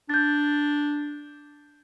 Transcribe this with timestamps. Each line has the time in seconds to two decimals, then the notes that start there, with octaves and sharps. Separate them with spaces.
0.09 D4 G6 A6